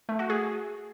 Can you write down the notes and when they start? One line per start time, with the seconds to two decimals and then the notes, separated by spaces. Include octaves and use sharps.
0.09 A3
0.19 F#4
0.30 G#4